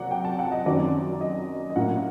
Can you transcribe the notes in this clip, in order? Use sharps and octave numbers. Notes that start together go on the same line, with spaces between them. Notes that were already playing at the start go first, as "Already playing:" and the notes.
Already playing: C3 F#3 A#3 D5 F#5
G5
A5
F#5
D#5
F#2 D#3 F#3 C4 D5
D#5
D#5
A2 F#3 A#3 F#5